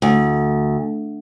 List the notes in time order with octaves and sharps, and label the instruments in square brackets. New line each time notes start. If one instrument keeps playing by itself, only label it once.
[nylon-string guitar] D2